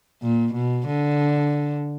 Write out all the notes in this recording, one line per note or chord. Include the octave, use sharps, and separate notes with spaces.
A#2
B2
D3